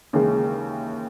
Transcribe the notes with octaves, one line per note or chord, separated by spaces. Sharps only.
D#2 C#3 E3 G#3